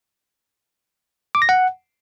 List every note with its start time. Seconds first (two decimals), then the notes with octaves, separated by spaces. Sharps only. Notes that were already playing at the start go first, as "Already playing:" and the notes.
1.35 D6
1.42 A#6
1.49 F#5